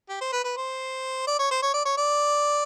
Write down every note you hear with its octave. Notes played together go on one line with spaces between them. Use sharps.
G4
C5
B4
B4
C5
D5
C#5
C5
C#5
D5
C#5
D5